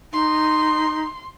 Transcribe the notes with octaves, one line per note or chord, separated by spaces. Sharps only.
D#4 C6